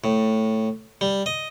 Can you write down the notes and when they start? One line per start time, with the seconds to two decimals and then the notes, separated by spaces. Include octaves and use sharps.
0.04 A2
1.01 G3
1.26 D#5